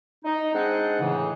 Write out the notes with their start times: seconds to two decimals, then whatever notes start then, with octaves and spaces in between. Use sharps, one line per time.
0.25 D#4
0.54 G#3 C4 D4 D#4 C5 F#5
1.00 A2 C#3 E3